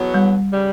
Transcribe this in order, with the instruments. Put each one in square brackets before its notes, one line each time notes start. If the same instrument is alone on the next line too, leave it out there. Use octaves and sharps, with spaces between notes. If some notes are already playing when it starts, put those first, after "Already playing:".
Already playing: [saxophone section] E2 B2 F#3 B3
[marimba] G3
[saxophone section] C#3 G3